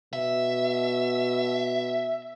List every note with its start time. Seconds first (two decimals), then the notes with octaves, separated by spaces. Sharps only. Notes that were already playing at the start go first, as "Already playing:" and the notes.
0.13 B2 E5